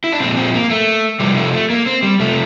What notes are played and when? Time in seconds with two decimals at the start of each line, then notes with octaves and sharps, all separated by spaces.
0.04 E4
0.12 D4
0.20 A#2 F3 C4
0.37 C4
0.54 A#3
0.70 A3
1.20 C3 F3 G3
1.37 A3
1.53 A3
1.70 A#3
1.86 C4
2.03 G3
2.20 C3 F3 A3